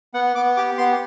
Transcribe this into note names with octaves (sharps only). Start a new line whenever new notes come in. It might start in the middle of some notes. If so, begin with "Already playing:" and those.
B3 F#5
B3 D6
G4 D6
B3 C6